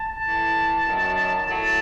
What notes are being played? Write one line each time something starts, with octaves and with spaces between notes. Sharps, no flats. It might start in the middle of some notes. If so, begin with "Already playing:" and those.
Already playing: A5
A2 E3
F#2 D#3 F#3
A2 F#3 A5